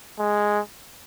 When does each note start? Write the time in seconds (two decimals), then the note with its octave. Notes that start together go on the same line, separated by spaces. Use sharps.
0.19 G#3